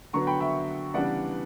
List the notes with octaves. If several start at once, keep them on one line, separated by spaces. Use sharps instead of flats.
D3 F#3 B3 A#5 C#6
G5 B5
E5 G5
C#3 E3 G3 B3 D4 D5 F#5